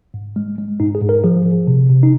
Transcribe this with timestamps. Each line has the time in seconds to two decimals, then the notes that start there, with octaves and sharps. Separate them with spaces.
0.14 G#2
0.36 G#3
0.58 G#3
0.80 G#2 D#4
0.95 G#4
1.01 G#2
1.09 A#4
1.24 F3 G#4
1.45 F3
1.67 C3
1.89 C3
2.03 D#4